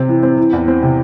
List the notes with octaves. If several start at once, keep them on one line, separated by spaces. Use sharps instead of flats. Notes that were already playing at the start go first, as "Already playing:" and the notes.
Already playing: C3 C4
E3
C4
E3
E2
C4
C3